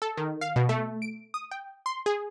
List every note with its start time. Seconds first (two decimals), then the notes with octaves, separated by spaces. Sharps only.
0.02 A4
0.17 D#3
0.41 F5
0.56 B2
0.69 A3
1.02 D7
1.34 D#6
1.51 G5
1.86 C6
2.06 G#4